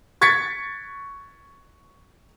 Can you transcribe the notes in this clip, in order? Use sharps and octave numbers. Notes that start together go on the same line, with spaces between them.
C#6 G#6 A6 B6 C#7